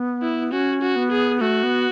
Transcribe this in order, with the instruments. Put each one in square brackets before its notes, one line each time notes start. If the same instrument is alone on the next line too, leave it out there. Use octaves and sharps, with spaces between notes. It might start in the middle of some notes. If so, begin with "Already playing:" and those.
Already playing: [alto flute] B3
[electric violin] E4
[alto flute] C#4 [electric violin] F#4
[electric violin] F#4
[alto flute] B3
[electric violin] G#4
[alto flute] A3 [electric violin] F#4
[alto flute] B3